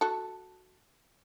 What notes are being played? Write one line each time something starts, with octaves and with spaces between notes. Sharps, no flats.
F#4 A4